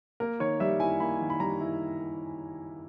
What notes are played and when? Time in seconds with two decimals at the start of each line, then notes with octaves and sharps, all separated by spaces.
0.20 A#3 A#4
0.40 D#3 C#5
0.60 G3 E5
0.80 E4 G#5
1.00 A#3 B5
1.20 D#3
1.30 B5
1.40 G3 A#5
1.60 E4